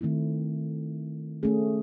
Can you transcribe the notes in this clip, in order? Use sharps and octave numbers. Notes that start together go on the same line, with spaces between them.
D#3 A3 C4 E4
A3 C#4 G#4